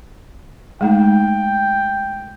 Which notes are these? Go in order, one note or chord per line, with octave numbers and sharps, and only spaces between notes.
G#3 A3 D#4 G5